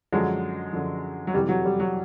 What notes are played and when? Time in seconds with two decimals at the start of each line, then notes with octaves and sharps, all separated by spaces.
0.12 F#2 D3 F3 F#3 G#3
0.73 F#2 D3 F3
1.27 F#3
1.33 F2 C3 E3 G3
1.49 F#3
1.65 G3
1.80 F#3